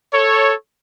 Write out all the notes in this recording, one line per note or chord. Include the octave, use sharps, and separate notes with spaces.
A4 C#5